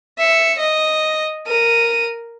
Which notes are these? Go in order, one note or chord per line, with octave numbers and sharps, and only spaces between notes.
E5 C#7
D#5
A#4 D#7